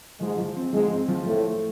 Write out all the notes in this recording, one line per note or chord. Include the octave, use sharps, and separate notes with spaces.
G#2 F3 G#3
F3
C4
G#2 F3 G#3
C4
F3
A2 F3 A3
A3